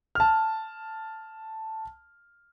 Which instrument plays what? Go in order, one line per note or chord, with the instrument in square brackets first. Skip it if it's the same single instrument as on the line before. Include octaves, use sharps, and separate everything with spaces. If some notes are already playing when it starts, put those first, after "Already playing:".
[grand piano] A5 F6